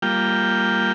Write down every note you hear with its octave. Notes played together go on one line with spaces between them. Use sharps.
G3 A#3 F4 G5